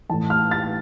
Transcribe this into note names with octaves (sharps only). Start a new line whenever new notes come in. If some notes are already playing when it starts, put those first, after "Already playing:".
A2 E3 A5
F6
A6